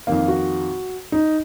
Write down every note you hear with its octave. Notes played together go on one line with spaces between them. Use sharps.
F2 D#3 A#3 F5
F#4
D#4